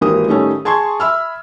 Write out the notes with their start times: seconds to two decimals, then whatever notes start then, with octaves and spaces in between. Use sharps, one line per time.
0.01 G#1 E3 A#3 G4 A#4 D#6
0.28 A2 D#3 G3 A3 C#4
0.65 G#4 A5 C6 C#6 G#6
1.00 E5 B5 E6 F6